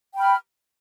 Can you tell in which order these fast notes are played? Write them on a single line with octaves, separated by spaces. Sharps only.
G5 B5 F6